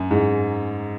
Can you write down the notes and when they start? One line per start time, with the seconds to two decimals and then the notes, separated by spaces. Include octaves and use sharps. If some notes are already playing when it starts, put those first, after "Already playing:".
Already playing: F#2
0.11 G#2